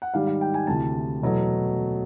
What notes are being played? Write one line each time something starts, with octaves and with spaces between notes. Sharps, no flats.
F#5
G#2 D#3 G3 F5
F5
G5
G#5
D2 C3 E3 A5
E2 B2 F#3 A3